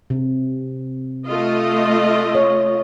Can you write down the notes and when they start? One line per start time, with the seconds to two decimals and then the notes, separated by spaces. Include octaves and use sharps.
0.10 C3
1.28 A3 F4 D#5
2.35 C#5